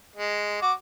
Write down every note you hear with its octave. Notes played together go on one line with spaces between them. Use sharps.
G#3
F#4 D6